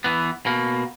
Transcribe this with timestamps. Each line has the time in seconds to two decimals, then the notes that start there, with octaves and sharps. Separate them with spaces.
0.04 E3 B3
0.46 B2 A#3